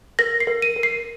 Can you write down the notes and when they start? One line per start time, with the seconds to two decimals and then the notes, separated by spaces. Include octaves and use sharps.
0.19 A#4 A#6
0.40 C7
0.47 A#4
0.62 D#7
0.76 A#4
0.83 C7